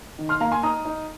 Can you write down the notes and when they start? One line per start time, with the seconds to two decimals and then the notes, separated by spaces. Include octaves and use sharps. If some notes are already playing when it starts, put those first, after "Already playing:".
0.19 D#3
0.29 C6 F6
0.40 A#3 F5 A#5
0.52 G#5 C6
0.63 D#4 A#5 D#6
0.85 D#4